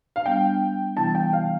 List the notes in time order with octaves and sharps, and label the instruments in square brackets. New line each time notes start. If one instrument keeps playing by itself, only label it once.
[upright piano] F5
[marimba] G3 B3 D4 [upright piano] G5
[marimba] C3 E3 G3 B3 E4 [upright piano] A5
[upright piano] G5
F5